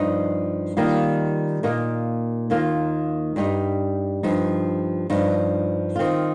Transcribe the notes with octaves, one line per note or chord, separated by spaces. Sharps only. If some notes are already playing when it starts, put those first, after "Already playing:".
Already playing: G2 F3 D#4
D#3 G3 A#3 F4
A#2 A#3 D#4
D#2 D#3 A#3 F4
G2 G3 D#4
G2 F3 D#4
G2 F3 D#4
D#3 C4 F4